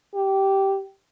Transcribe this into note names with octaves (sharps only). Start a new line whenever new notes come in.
G4